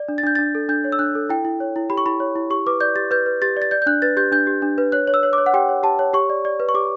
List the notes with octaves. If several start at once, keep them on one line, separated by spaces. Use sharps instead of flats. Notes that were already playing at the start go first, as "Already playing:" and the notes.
Already playing: D5
D4
A6
D4 G6
D4 A6
A4
D4 G6
C#5
E6
D4 F#6
A4
E4 G5
E4
C#5
E4
G4 B5
C#6
E4 B5
C#5
E4
G4 C#6
B4 D6
D5 G6
G4 A6
B4 G6
B4
G4 A6
D5
A6
D5 G6
G6
D4 F#6
B4 A6
G4 G6
D4 G6
G4
D4
B4
C#5 F#6
C#5
E6
C#5
D6
C#5
F#5
G4 G5
C#5
G4 A5
C#5
G4 C#6
D5
D5
B4
C#6
G4 D6